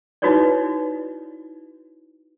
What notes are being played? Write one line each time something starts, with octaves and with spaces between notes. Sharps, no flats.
D#4 E4 F#4 B4 C#5 D5